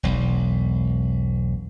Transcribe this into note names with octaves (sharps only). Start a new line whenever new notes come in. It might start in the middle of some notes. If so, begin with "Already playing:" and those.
E1 B1